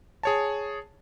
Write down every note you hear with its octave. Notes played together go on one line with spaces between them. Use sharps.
G#4 C#5 A5